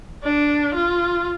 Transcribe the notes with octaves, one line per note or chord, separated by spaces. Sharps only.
D4
F4